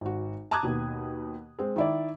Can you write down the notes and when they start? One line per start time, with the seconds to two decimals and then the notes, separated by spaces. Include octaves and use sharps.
0.01 G#1 F#4
0.51 A5 A#5 D6 D#6 F#6 G#6
0.63 D#2 B2
1.59 G#3 C4
1.76 D#3 E4 D5